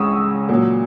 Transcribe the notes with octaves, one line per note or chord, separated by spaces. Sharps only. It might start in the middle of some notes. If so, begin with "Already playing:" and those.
Already playing: C#2 C#3 G#3 C#6 D#6 E6
A#2 F#3